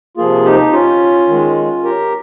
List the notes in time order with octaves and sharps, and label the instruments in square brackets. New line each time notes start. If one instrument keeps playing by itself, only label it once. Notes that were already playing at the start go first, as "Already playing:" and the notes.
[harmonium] C3 F3 A#3 F4 G#4
D#4 G4
C#4 F4
D#3 G#3
G4 A#4